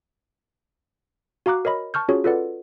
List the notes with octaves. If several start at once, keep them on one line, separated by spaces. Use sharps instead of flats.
F#4 F5 A#5 D6 F#6
A#4 C#5 D#5 B5
A5 C#6 F6 G6
C#4 F4 F#4 G#4 C#5
F4 A4 B4 D5 F#5